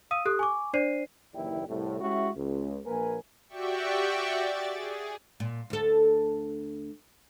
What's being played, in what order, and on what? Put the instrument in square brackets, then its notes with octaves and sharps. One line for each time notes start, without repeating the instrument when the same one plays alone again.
[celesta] F5 D#6 E6 D#7
G4 A4 D#6 F#6
G#5 C#6 D6
D4 C5 D5 C7 D#7
[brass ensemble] F#1 D#2 E3 E4 D5 G5
C2 A2
G#3 C#4 E4 F#4 G4 E5
C#2
A#1 A#3 A#4 B4 G#5
[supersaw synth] F#4 G4 D5 E5 G5 C#6
D5 A6
G#4
[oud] A#2
D2 A4